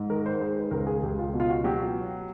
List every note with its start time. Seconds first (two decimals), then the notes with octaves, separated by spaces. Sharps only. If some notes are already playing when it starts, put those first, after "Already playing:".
Already playing: G#2
0.10 D#3 A#4
0.26 C5
0.40 G#3 C5
0.56 B4
0.71 C#2 A#4
0.87 G#4
1.03 C#2 G4
1.19 F4
1.34 B2
1.40 F4
1.50 F#4
1.64 F#3 G4